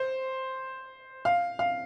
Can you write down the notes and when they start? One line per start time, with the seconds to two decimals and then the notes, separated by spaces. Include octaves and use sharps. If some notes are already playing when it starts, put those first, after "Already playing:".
Already playing: C5
1.25 F5
1.59 F5